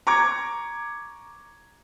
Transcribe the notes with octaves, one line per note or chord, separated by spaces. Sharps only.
A#5 C#6 D6 G#6